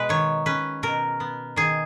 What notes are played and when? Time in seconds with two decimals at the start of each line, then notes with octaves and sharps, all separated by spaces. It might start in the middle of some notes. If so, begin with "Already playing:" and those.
Already playing: B2 G#3 B4
0.09 D#3 C#5
0.46 C#4 B4
0.83 B2 A#4
1.20 B3
1.56 D#3 G#4